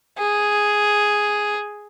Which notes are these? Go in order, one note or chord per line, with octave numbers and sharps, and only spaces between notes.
G#4